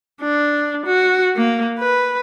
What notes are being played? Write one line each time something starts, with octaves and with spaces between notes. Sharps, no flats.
D4
F#4
A#3
B4